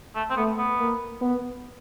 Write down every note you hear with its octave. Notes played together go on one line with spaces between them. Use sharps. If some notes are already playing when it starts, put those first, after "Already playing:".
A3
C4
A3 B3
B3
A#3
B3